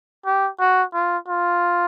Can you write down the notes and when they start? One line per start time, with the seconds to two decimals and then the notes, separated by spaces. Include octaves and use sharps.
0.26 G4
0.60 F#4
0.94 F4
1.28 F4